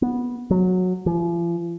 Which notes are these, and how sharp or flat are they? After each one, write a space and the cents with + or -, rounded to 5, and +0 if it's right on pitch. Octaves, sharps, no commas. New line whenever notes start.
B3 -10
F#3 -15
F3 -45